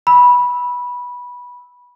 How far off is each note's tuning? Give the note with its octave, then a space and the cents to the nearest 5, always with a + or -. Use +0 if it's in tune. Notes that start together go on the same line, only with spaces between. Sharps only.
B5 -15 E6 -15